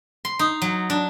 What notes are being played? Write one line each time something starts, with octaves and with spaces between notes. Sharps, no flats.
C6
D#4
F#3
D4